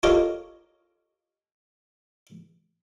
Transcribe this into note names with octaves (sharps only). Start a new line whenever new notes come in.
F4 G4 A4 A#4 C#5 D#5